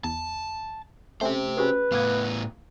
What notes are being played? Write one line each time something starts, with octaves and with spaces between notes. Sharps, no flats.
E2 A5
A3 C4 C#4 G4 C5
C#4 F#4 G#4 B4
A2 B3 F5 D6 G#6